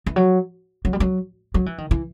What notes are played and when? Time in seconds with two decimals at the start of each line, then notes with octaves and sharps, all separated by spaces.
0.06 E3
0.16 F#3
0.85 F#3
0.93 G3
1.00 F#3
1.54 F#3
1.66 E3
1.78 D#3
1.91 E3